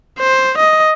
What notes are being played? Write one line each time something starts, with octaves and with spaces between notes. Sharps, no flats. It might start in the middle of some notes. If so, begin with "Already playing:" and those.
C5
D#5